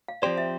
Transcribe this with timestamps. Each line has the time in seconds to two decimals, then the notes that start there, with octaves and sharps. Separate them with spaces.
0.08 F5
0.22 F3 C4 G4 C5 D5
0.38 E5